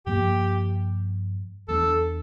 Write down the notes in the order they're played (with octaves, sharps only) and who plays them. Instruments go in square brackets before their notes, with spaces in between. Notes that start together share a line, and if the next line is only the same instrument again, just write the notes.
[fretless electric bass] G2 F3 A#3 [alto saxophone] G4
[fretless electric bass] E2 E3 A3 D4 [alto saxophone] A4